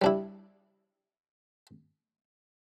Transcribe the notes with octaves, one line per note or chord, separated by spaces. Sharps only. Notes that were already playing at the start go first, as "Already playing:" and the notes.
G3 D4 E4